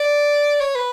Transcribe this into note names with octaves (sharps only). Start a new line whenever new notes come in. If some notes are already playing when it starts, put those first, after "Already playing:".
Already playing: D5
C#5
B4